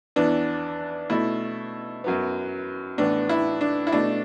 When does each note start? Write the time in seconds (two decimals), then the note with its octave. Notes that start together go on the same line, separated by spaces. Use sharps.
0.16 E2 E3 B3 D4
1.10 B2 A3 E4
2.04 F#2 F#3 B3
2.98 A2 E3 B3 D4
3.29 E4
3.61 D4
3.87 E4
3.92 B2 A3 D4